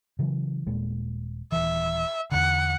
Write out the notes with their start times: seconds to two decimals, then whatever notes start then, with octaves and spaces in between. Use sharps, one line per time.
0.19 C#3 E3 F#3
0.67 D#1 A#2 G#3
1.52 D#1 E3 E5
2.32 E2 D3 F#5